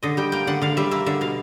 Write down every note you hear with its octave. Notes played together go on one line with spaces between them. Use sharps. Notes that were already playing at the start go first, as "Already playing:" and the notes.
D3 D#5
G3 G5
A#3 G5
D3 F#5
D3 F5
G3 E5
A#3 E5
D3 E5
B2 F5